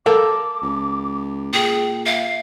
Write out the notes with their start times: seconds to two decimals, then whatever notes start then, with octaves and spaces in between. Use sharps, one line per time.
0.06 A4 A#4 F5 D6
0.62 C#2
1.53 A#2 G#4 G5
2.06 E5 F5